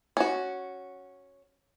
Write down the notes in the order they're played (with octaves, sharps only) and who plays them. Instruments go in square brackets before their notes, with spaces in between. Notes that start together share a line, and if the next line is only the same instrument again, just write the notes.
[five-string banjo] C#4 F#4